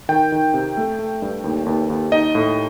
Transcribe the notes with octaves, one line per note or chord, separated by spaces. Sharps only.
D#3 G5
D#3
C3
A3
A3
G2
D#2
D#2
D#2
D#4 D#5
A2